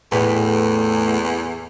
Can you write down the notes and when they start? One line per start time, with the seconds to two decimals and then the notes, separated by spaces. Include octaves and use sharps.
0.12 E2 A2 B4